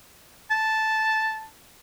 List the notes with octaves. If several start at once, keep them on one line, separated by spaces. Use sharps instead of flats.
A5